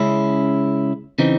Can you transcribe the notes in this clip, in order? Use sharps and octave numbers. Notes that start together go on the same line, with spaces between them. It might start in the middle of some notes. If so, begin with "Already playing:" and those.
Already playing: C#3 G#3 C#4 E4
C#3 E3 C4 D#4